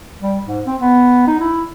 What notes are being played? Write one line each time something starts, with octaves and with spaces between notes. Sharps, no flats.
G3
G#2
C4
B3
D#4
E4